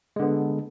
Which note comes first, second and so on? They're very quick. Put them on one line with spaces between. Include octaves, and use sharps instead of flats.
G#3 D3 B3